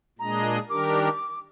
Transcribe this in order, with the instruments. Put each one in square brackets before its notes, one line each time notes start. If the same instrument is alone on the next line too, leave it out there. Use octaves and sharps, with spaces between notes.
[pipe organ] A#2 G#3 D4 G#4 D#5 [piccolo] A#5
[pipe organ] D#3 G3 D4 G4 A#4 [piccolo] D6